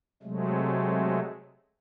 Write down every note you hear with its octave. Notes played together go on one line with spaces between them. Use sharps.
C3 F#3 G#3 A3